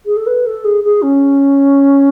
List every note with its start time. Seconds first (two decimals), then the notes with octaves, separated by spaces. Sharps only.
0.06 G#4
0.16 A4
0.26 B4
0.46 A4
0.64 G#4
0.84 G#4
1.02 C#4